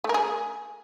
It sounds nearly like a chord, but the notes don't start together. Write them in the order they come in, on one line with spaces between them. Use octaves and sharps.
A3 A#4 G#4